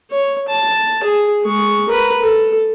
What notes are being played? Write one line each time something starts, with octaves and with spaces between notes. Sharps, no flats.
C#5
A5
G#4
G#3 C#6
A#4 B4
A4